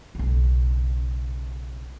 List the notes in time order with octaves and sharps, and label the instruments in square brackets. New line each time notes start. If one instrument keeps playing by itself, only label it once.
[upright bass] B1 C#3